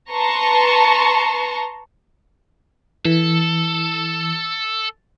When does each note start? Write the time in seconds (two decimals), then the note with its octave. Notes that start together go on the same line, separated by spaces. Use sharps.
0.11 B4 A5 A#5 C6 C#6
3.05 E3 A4